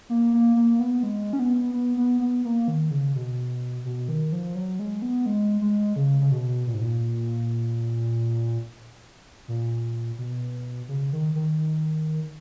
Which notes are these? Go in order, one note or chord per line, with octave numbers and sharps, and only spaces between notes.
A#3
A#3
A#3
B3
G#3
C#4
B3
B3
B3
B3
A#3
D#3
C#3
B2
B2
D#3
F3
F#3
G#3
B3
G#3
G#3
C#3
C#3
B2
A#2
G#2
A#2
A#2
B2
C#3
D#3
D#3